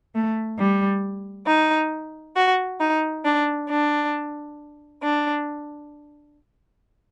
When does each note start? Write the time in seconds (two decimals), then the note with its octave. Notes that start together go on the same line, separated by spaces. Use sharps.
0.14 A3
0.59 G3
1.47 D#4
2.36 F#4
2.80 D#4
3.25 D4
3.69 D4
5.02 D4